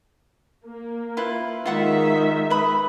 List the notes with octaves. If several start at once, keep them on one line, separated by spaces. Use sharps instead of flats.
A#3
E4 F4 B4
D#3 G#3 F4 E5 F#5 C#6
B4 B5 D#6